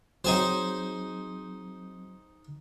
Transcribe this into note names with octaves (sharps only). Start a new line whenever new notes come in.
F#3 C4 D#4 G#4 C5